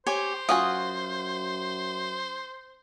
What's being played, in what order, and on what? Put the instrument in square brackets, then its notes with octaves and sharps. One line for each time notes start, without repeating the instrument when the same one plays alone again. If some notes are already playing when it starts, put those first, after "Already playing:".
[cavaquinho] G4 C#5 G#5 [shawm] C5
[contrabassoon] F#2 [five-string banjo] F4 F#4 G#5 [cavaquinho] D#6